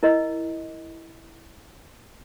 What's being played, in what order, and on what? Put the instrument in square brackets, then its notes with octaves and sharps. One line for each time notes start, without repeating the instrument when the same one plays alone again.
[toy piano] E4 A#4 D#5